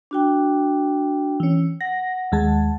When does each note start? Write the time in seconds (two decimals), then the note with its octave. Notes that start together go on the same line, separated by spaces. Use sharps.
0.11 D4 F#4 G5
1.40 E3 C#4
1.81 F#5 A#6
2.32 D#2 G#3 A5